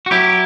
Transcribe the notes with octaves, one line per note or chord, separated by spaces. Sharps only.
F#4
F#3 E4 G4